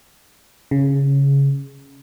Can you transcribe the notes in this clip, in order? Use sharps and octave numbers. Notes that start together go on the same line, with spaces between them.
C#3